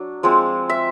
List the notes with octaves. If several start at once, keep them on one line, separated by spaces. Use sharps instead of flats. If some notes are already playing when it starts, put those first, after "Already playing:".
Already playing: F#3 D4
F3 G#3 C4
E5